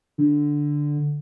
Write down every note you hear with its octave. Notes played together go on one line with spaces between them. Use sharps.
D3